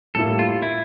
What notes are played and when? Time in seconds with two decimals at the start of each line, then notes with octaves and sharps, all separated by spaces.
0.15 A2 G3 A#3 E4 A4
0.39 F4
0.62 E4